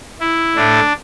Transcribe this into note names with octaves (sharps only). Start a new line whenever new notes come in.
E4
A2 A3 D4